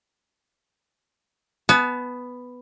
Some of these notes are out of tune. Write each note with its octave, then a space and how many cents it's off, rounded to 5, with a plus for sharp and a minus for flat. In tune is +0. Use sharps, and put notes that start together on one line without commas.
B3 +5 A5 -45